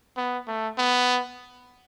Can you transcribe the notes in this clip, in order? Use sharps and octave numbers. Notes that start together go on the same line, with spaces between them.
B3
A3
B3